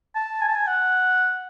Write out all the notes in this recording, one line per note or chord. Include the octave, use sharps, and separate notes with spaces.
A5
G#5
A5
G#5
F#5